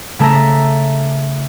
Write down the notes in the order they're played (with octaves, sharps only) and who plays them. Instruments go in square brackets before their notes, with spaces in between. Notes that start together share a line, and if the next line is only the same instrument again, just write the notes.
[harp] C#3 A3 A4 E5 A#5